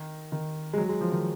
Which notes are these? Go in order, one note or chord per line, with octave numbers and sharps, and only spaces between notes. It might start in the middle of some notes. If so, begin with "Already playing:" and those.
Already playing: D#3
D#3
G#3
F#3
G#3
F3
D#3